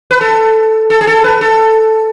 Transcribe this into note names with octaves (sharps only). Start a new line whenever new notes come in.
B4
A4
A4
G#4
A4
B4
A4